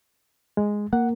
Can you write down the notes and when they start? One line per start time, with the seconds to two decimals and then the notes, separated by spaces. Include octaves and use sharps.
0.57 G#3
0.93 A#3 F#5